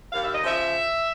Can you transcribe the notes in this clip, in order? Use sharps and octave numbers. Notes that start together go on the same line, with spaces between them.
D#2 F5
E5
D#5
C#3 F3 E5